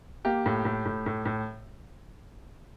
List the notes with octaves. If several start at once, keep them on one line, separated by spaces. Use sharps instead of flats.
A#3 G4
A2
A2
A2
A2
A2